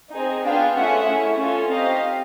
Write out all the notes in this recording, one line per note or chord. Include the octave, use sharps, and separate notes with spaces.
C4 D#4 G#4
B3 D4 F4 G#4 F5 G5
A3 C#4 F4 G#4 E5 F#5
A3 C#4 E4
C#4 F4 A4
C4 D#4 G4 D#5 F5